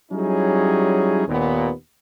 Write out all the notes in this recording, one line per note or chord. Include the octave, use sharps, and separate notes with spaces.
F#3 G3 C#4 D#4 E4 G#4
D#2 A#2 B3